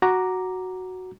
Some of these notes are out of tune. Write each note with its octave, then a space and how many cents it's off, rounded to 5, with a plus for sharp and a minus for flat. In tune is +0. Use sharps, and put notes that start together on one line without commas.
F#4 +0 A#5 +0 D6 +0